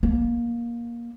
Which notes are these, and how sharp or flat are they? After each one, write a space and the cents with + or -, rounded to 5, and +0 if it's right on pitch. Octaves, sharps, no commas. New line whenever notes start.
A#3 +15